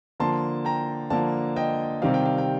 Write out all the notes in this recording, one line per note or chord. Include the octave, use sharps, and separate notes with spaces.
D3 F3 A#3 A5 C6
G5 A#5
D3 F3 A#3 F5 A5
D#5 G5
C3 D#3 G3 C4 F5
G5
F5
G5